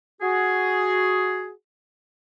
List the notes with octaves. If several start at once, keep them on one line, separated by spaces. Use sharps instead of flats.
F#4 G#4